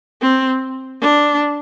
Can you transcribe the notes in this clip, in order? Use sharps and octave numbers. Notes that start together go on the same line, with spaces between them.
C4
D4